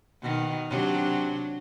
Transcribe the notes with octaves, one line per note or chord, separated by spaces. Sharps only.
B2 D#3
C3 F#3 D4